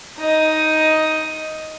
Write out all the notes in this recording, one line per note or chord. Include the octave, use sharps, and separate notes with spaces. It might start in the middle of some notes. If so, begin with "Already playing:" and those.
D#4 D#5